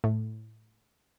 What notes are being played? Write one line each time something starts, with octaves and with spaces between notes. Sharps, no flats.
A2